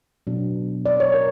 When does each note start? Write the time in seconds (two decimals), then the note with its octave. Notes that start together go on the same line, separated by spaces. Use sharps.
0.27 B2 F#3 B3 D4
0.86 D5
1.00 C#5
1.14 A#4